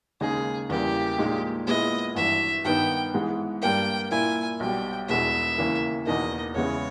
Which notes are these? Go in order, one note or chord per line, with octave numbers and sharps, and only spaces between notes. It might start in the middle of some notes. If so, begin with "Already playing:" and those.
D#2 C#3 G#3 D#4 G#4
E2 C#3 E3 G3 A#3 G4
A#1 A#2 G#3 D#4
A#2 G#3 B3 E4 D#5
G#1 G2 E3 E5
G2 D#3 G3 B3 D#4 G5
G#2 E3 G#3 B3
G2 G3 A#3 G5
A#2 A#3 E4 G#5
B1 B2 G3 G5
E1 E2 B2 G#3 E5
D#2 C#3 E3 A#3
E1 E2 B2 A#3 D#4 D#5
E2 C#3 G#3 B3 E4 C#5